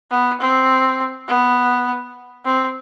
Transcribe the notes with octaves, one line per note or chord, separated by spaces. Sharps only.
B3
C4
B3
C4